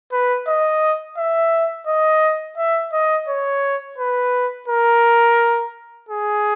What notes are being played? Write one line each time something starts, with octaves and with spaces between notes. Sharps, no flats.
B4
D#5
E5
D#5
E5
D#5
C#5
B4
A#4
G#4